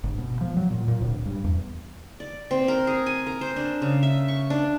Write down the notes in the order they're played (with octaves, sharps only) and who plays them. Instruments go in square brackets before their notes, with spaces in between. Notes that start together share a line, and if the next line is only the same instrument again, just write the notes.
[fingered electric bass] G1
B2
F3
F#3
A#2
A#2
D1
G2
E2
[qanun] D5
C4
A#4
G#4
G#5
A#4
C5
D4
C#3
E5
C#6
D4